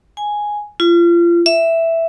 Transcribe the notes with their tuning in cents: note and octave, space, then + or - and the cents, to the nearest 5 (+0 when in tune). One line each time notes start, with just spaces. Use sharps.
G#5 +0
F4 -30
E5 +0